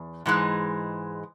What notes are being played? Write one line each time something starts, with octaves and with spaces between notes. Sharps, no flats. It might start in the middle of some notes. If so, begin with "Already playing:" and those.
Already playing: E2
G#2 E3 G#3